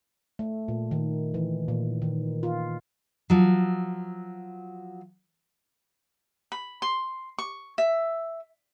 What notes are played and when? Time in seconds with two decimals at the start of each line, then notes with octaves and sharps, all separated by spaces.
0.39 A3
0.68 A#2
0.91 D#3
1.34 E3
1.68 A#2
2.02 D#3
2.43 F4
3.30 F3 F#3
6.52 B5
6.82 C6
7.39 C#6
7.78 E5